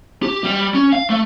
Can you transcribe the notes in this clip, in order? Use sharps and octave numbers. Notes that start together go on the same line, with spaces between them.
G4
G3
C#4
F5
A3